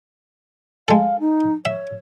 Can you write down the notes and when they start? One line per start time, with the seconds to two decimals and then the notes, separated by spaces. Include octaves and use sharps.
0.88 G#3 A4 F5
1.20 D#4
1.65 C#5 E5